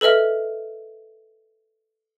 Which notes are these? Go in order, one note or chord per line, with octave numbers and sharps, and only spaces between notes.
A4 B4 D#5 E5 F6